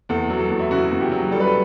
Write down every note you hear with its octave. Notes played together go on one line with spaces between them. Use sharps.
E2 A4
F#3
A4
E2
E4
C#3 F#4
E2
G4
F#3
G3 A4
B4
A4